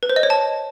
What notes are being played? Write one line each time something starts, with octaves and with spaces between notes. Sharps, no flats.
B4
C5
D#5
C#5
A5